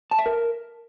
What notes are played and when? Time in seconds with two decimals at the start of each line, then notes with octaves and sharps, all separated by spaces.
0.11 A5
0.19 E5
0.26 A#4